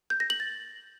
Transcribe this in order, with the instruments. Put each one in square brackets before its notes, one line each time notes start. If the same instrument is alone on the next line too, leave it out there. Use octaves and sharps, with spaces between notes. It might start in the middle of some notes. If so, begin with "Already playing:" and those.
[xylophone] G6
A#6
F#7
A6